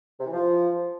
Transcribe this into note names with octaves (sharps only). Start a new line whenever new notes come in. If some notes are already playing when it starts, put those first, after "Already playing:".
C3
E3
F3